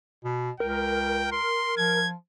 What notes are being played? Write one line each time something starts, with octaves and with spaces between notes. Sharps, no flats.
B2
C#2 A#4 G5
C6
F3 G#6